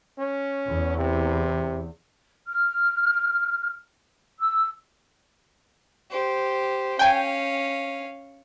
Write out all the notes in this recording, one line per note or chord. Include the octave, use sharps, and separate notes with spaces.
C#4
E2
C3
F6
E6
G4 C5
C#4 F5 G5 G#5